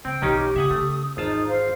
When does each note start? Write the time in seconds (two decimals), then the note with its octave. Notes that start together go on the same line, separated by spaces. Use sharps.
0.05 C#3 C4 G5
0.22 B1 D#3 E3 C#4 D#4 G4
0.56 C#3 E5 F#5 G#5 D#6
0.71 C#3 A3
1.17 G#1 E2 D#4 F4 C5 A5
1.48 C5 F5